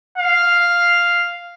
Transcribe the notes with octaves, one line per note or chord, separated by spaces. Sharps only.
F5